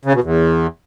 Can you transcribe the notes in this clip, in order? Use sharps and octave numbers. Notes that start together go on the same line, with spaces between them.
C#3
B2
E2